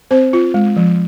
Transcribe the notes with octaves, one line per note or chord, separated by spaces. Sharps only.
C4 C5
F4
G#3
F3